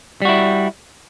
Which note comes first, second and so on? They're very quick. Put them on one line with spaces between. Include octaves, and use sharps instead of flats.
G3 F#4 E4